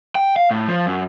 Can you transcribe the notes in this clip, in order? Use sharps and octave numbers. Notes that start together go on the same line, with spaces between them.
G5
F5
A2
F3
F#2